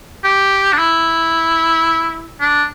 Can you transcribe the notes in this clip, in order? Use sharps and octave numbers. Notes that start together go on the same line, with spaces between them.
G4
D4
E4
D4